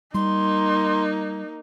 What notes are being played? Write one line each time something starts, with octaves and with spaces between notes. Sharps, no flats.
G3 A#3 D#4 C6